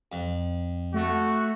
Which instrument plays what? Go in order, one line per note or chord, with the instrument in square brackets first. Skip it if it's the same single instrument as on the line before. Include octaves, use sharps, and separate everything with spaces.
[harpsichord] F2
[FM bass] A3 [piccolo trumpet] F#4